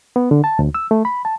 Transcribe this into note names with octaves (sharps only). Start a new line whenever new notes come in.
B3
D3
A5
D2
E6
A3
B5
A5